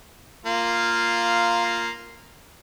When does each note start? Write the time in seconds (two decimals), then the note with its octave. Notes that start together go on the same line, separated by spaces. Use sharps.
0.46 A#3 F4